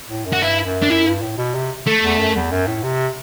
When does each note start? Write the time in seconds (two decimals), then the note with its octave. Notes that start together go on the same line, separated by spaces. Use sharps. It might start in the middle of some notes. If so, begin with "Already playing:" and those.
0.09 A2
0.25 F#2
0.33 F#4
0.41 G2 E4
0.65 F#2
0.82 D4
0.90 F#2 E4
1.06 G2
1.22 A2
1.38 B2
1.54 C3
1.87 A3
2.03 E2
2.19 F#2
2.35 E2
2.52 F#2
2.67 A2
2.83 C3